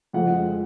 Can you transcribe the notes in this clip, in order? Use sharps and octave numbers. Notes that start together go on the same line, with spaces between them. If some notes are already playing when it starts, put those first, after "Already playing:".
F2 C#3 F3 G#3 F#5